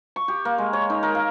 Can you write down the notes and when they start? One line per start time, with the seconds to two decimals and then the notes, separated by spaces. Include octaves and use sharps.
0.16 C#6
0.28 G4
0.45 A#3
0.58 G#3
0.73 C#5
0.90 D#4
1.03 A#4
1.15 F5